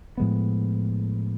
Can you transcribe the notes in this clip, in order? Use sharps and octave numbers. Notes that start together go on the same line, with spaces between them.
A2 F3 G#3 B3